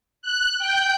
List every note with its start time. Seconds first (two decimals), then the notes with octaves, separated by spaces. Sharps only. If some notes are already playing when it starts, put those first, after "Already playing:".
0.22 F#6
0.59 G5 G6